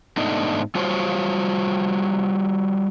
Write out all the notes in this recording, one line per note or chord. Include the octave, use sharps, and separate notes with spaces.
G#2 A3 B3 D4 D#4 D#5
G3 F4 F#4 C5 C#5